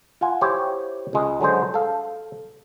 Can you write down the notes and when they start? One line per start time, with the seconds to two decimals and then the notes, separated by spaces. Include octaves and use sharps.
0.21 F4 F#5 G#5
0.41 E4 G4 C5 C#5
1.13 C#2 G#3
1.41 D3 F#3 G#3 C5
1.74 A4 F5